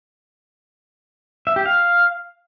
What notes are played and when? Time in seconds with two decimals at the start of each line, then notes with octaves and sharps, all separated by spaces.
1.47 E5
1.56 G4
1.66 F5